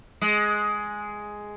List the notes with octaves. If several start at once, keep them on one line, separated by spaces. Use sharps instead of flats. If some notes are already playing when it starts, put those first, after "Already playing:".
G#3